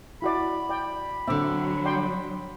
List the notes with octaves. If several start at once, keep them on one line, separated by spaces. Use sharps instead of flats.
E4 F#4 D5 B5
D5 G5
D3 F#3 C4 E5 D6
D5 G5 C6